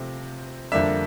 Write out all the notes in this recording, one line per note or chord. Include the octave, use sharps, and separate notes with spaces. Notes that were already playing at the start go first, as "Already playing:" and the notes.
Already playing: C3 F3 A3 C4
F2 D3 G3 A#3 D4 E5